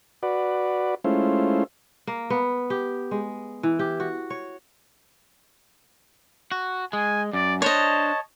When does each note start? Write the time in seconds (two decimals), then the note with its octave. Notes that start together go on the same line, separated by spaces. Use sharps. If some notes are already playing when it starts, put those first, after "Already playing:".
0.23 F#4 B4 D5
1.04 G#3 A3 C#4 E4 F4 C5
2.07 A#3
2.30 B3
2.70 G4
3.11 G#3
3.63 E3
3.79 G4
4.00 F#4
4.30 C#5
6.51 F#4
6.93 G#3 G#5
7.33 F#2 D5
7.62 D4 C5 C#5 D#5 A5